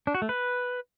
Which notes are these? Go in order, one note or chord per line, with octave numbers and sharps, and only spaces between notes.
D4
F#4
A3
B4